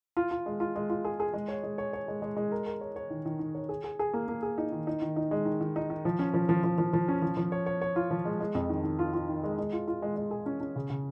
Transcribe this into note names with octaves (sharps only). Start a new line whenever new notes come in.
F4
F4
G#3
F4
G#3
F4
G#4
G#4
G#3
C#5
G#3
C#5
C#5
G#3
G#3
G#3
A#4
A#4
C#5
C#5
D#3
D#3
D#3
C#5
G#4
G#4
G#4
A#3
A#3
G#4
D#4
D#3
D#4
D#3
D#4
G#3
D#3
D#3
D#4
D#3
F3
C#4
F3
F3
F3
F3
F3
C#4
F3
F3
C#5
C#5
C#5
F4
F3
G#3
G#3
F2
D#3
D#3
F4
F4
D#3
G#3
G#3
F4
F4
G#3
G#3
G#4
C#4
C#4
C#3
C#3